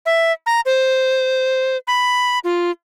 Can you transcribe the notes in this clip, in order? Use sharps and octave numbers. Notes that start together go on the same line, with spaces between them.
E5
A#5
C5
B5
F4